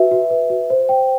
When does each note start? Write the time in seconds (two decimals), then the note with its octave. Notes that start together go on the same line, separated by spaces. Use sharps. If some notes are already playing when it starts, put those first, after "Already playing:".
Already playing: F#4 B4 E5
0.11 F#4
0.30 B4
0.50 F#4
0.70 C5
0.89 G5